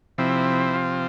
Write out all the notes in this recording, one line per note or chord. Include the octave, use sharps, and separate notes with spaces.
C3 F3 C4 E4
F4